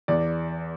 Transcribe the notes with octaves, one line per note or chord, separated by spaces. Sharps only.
E2 D5